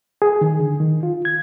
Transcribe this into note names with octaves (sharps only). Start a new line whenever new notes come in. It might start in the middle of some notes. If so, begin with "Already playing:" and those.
G#4
D#3
D3
D#3
F4
G#6